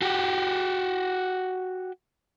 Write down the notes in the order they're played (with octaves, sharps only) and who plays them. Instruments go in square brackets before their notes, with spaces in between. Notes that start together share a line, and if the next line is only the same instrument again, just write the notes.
[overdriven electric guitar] F#4 G4